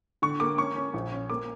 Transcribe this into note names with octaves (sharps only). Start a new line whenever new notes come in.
D3 C#6
A#3 D6
C#4 C#6
C#4
A#1
C#4
A#3 D6